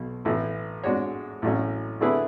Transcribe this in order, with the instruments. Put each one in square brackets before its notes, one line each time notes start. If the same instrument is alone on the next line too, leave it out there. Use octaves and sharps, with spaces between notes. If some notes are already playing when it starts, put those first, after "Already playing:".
Already playing: [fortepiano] B1 B2
A1 A2 E3
G#2 G#3 D4 F#4 C#5
A1 A2 F#3 C#4
D3 A3 E4 G#4 B4